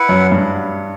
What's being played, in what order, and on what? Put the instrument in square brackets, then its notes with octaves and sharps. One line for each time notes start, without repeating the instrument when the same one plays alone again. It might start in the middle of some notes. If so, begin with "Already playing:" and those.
Already playing: [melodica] E4 B4 F#5
[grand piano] F#2
G2